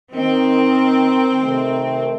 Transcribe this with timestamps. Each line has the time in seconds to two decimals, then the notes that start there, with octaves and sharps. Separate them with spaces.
0.14 D#3 C4
1.43 C3 D#3 A3